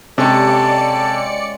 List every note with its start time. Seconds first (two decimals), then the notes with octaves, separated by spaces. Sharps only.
0.18 C3 G#3 C#4 G4 A4 D5 C#7
0.48 F5